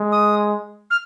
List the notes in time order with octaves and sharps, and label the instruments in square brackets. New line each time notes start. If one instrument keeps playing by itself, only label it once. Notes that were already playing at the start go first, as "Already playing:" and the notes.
Already playing: [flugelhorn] G#3
[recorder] D#6
F6